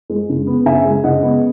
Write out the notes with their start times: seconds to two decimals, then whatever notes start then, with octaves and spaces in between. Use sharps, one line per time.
0.10 G#3
0.29 C#3
0.47 B3
0.66 C#3 E5 G#5
0.85 G#3
1.04 C#3 D#5 F#5
1.23 B3